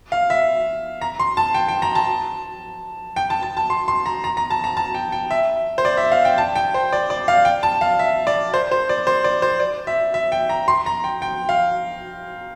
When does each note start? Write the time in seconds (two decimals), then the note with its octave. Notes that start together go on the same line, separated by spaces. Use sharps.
0.12 F5
0.30 E5
1.01 A#5
1.20 C6
1.37 A5
1.54 G5
1.68 G5
1.82 A#5
1.95 A5
3.16 G5
3.30 A5
3.43 A5
3.57 A5
3.70 C6
3.88 C6
4.06 A#5
4.24 A#5
4.37 A#5
4.50 A5
4.64 A#5
4.77 A5
4.95 G5
5.12 G5
5.31 E5
5.78 C5
5.85 D5
5.97 E5
6.12 F5
6.25 G5
6.38 A5
6.56 G5
6.74 C5
6.93 D5
7.10 D5
7.28 F5
7.45 G5
7.63 A5
7.81 F5
7.99 E5
8.27 D5
8.54 C5
8.71 C5
8.89 D5
9.07 C5
9.24 D5
9.42 C5
9.60 D5
9.87 E5
10.14 E5
10.32 G5
10.49 A#5
10.68 C6
10.86 A#5
11.04 G5
11.22 G5
11.49 F5